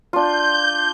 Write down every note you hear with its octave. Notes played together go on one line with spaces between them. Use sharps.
D4 F4 G6